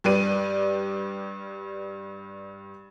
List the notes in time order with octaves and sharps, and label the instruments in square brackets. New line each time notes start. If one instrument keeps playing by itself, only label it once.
[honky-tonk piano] G2 G3 G4 B4 D5 D#7